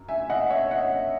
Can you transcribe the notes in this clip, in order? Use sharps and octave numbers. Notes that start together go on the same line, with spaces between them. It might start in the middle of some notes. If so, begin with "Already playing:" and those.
Already playing: F#2
E5 G#5
D#5 F#5
C#5 E5
D#5 F#5